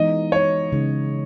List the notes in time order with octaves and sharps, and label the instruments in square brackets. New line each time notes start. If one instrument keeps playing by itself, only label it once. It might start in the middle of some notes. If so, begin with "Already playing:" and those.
Already playing: [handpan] E3 G#3 B3 D#4 [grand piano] D#5
[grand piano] C#5
[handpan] C#3 G#3 D#4